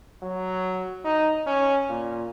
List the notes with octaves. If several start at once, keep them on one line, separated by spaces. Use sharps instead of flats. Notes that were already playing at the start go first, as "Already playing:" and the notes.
F#3
D#4
C#4
A#2